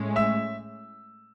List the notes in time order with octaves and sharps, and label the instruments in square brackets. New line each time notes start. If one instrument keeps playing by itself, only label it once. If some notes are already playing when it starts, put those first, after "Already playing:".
Already playing: [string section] A2 G#3 C#4
[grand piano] E5 E6